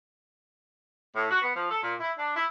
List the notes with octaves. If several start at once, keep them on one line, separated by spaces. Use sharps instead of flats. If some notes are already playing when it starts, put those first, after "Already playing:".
A2
F#4
B3
F3
A4
A#2
E4
D4
E4